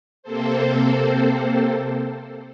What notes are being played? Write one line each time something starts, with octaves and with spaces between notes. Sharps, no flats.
C3 A#3 C4 A4 C5